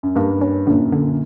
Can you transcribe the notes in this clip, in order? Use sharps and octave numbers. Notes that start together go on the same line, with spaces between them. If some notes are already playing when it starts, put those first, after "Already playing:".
F#2
G2 A#3
C#4
F#2 A#2 D3
D3